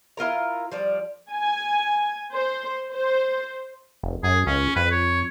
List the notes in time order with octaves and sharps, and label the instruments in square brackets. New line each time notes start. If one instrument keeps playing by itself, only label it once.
[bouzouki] E4 F4 A#4 A#5
F3 G3 D5
[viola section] G#5
C5
C5
[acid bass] F1
[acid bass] F#2 [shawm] G#4
[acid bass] C#2 [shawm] C#4
[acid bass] F2 [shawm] B4
[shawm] C#5